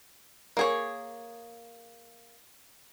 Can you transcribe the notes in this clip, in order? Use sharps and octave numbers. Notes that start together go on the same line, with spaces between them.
A#3 G#4 C#5